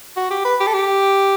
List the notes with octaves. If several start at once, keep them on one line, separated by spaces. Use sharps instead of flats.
F#4
G4
B4
G4
A4
G4